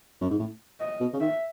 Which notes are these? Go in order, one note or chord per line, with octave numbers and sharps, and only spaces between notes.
F#2
G#2
A2
D#5
B2
C#3
D#3 E5